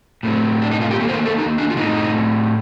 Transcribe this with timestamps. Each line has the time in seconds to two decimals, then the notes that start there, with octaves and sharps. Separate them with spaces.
0.23 A2 A3 C4
0.62 D4
0.71 D#4
0.81 F4
0.91 G4
1.00 A#3 A4
1.04 D#3 C5
1.13 A#4
1.25 A4
1.38 D#4
1.58 D4
1.70 F4
1.76 A2 A3 C4 D#4